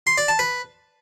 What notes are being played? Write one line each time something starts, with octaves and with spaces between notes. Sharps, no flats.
C6
D5
A5
B4